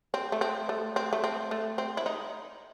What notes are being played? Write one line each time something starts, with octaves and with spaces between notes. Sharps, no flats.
C4
A3
C4
A3
C4
A3
C4
A3
C4
E4
D#4